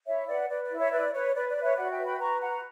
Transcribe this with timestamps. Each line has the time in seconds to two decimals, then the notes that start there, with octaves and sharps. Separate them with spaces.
0.07 E4 C#5 E5
0.28 B4 D5 F#5
0.50 B4 D5
0.64 D5
0.71 E4
0.78 C#5 E5
0.92 B4 D5
1.13 B4 C#5
1.35 B4 D5
1.49 D5
1.56 B4
1.63 C#5 E5
1.77 F#4 D5 F#5
1.91 E5 G5
1.99 B4
2.05 G5 B5
2.19 B4 A#5 C#6
2.41 F#4 F#5 A#5